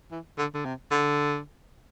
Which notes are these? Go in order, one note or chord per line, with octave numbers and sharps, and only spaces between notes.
E3
D3
D3
C3
D3